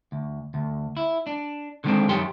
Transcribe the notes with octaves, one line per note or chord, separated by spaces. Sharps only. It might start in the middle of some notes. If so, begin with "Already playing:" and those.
D2
D2
E4
D4
D3 D#3 G#3 A#3 C4 D4
F#2 D#3 G4 C#5 G5 C6